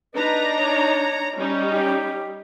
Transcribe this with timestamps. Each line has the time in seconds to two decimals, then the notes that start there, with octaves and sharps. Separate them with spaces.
0.14 D4 D#4 B4 A#5
0.57 C#5
1.36 G3 C#4 D#4
1.71 G4